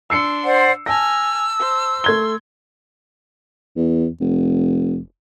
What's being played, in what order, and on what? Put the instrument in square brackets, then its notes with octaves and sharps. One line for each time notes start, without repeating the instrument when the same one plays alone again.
[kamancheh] D4 C6 [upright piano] E6 C7 C#7
[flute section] C5 D5 F#5
[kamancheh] G#5 F6 [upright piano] A5 A#6 [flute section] E6
[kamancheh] C5
[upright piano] A3 G#6 G7 [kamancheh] C6
[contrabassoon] E2
F1